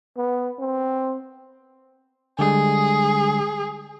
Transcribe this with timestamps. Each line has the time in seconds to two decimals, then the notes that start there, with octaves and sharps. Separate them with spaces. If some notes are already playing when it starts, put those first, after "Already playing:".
0.17 B3
0.59 C4
2.39 D3 G3 G#3 G#4